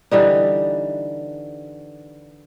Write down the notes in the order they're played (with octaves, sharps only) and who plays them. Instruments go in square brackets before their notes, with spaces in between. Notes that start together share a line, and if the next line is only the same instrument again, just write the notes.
[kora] D3 E3 G3 D#4